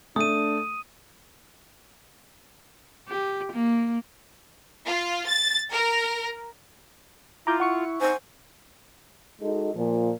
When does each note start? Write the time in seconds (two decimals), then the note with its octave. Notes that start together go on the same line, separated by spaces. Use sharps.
0.16 A3 D4 D#6 D#7
3.09 G4
3.52 A#3
4.85 F4
5.26 A6
5.71 A#4
7.47 E4 F4 A#5 D6 G6
7.60 E4 F#5 C#6 C#7
8.01 D#4 C5 G#5
9.41 G#3 D#4 F#4 A4
9.75 A#2 F3